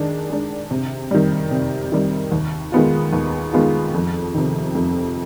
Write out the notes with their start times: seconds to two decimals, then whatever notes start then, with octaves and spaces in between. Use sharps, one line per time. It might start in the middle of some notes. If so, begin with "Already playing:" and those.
Already playing: D#3 G#3 D4
0.30 G#3 D4
0.71 C3
1.11 D#3 G3
1.51 C3
1.92 D#3 G3
2.32 D#2
2.72 D#3 G#3 B3 F4
3.13 D#2
3.53 D#3 G#3 B3 F4
3.94 F2
4.34 C3 D#3
4.75 F2